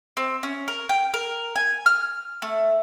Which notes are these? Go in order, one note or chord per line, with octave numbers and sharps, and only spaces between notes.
C4
C#4
A#4
G5
A#4
G#5
F6
A3